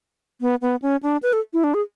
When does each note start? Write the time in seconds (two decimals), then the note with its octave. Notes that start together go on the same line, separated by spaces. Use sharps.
0.41 B3
0.62 B3
0.82 C#4
1.03 D4
1.23 B4
1.33 A4
1.53 E4
1.64 D4
1.74 G#4